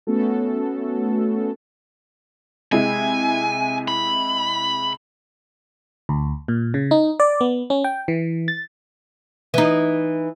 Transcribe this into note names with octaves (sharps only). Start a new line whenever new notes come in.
A3 B3 C#4 F#4 A4
C3 G#3 E4 G#5
B5
D2
A#2
C#3
D#4
D5
B3
C#4
G5
E3
A6
E3 D#4